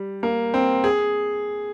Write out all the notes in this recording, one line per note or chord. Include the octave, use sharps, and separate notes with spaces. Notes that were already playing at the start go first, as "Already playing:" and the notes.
Already playing: G3
A#3
C4
G#4